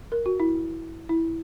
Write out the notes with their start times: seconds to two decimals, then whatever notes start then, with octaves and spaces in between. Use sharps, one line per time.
0.12 A#4
0.26 F#4
0.40 E4
1.09 E4